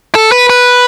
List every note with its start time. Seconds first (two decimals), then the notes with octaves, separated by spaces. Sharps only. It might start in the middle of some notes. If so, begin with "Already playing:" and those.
0.15 A4
0.32 B4
0.50 B4